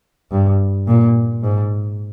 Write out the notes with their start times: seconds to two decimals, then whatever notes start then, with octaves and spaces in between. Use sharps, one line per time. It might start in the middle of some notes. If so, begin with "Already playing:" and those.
0.32 G2
0.88 A#2
1.43 G#2